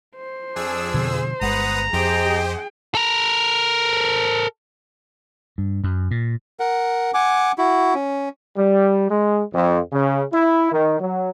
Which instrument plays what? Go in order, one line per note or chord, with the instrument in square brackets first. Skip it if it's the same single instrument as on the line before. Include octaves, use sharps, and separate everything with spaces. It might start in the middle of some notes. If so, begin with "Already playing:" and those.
[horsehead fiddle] C5
[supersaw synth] F2 G#4 E6 [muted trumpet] D4
[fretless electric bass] B2 D3 F3
[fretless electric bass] G1 G#3 [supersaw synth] B4 F#5 D#6 [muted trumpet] A#5
[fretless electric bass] F2 [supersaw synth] G4 C5 D#5 [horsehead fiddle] G#4 G5
[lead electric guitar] A4 A#4
[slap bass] G2
F#2
A#2
[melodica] A#4 F#5
F#5 G#5 D6
E4 F#4
C#4
[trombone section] G3
G#3
F2
C#3
E4
D#3
F#3